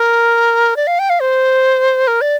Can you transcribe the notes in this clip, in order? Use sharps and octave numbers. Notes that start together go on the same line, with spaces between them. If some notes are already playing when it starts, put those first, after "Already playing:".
Already playing: A#4
D5
F5
G5
F5
C5
A#4
D5